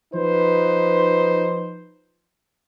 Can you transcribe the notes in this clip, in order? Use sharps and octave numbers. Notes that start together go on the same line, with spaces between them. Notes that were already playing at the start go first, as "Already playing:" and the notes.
F3 D#4 B4 C5